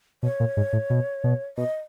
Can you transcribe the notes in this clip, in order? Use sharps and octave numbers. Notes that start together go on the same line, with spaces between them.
B2 C#5
A#2
G#2
A2
B2
B2
B2 D#5